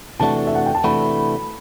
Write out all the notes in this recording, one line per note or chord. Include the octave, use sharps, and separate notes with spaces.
C3 E3 A3 D4 F#4 A5
E5
F#5
G5
A5
C3 E3 A3 D4 F#4 B5